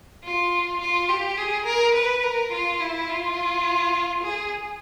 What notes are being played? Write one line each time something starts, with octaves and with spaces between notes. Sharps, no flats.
F4
F4
G4
G#4
A#4
B4
A#4
F4
E4
F4
G#4